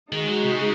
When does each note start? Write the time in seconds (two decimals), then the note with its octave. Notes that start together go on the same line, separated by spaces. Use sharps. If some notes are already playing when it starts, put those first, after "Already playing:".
0.12 D#3 G#3 D#4 F#4
0.28 F#3
0.43 C3
0.59 C#3